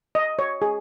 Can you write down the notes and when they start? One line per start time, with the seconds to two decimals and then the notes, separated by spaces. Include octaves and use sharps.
0.15 D#5
0.39 C#5
0.62 G#4